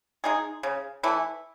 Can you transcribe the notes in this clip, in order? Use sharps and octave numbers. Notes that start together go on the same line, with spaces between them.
G#3 D#4 G#4
C#3
E3 A3 E4